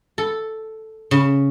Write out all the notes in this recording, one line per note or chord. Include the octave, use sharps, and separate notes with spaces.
A4
C#3